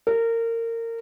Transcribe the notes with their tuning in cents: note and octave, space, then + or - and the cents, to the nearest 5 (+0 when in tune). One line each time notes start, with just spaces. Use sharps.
A#4 -25